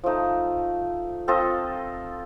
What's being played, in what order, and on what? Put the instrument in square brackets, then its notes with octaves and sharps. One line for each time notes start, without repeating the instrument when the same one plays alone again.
[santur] F3 A3 D#4
C4 F4 A4 D#5